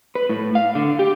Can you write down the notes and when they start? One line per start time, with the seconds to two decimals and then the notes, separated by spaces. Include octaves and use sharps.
0.15 B4
0.29 A2
0.55 F5
0.75 D3
0.99 G4